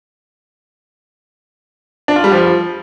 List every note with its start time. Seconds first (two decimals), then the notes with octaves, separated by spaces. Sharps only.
2.08 D4
2.16 F4
2.24 G3
2.32 F3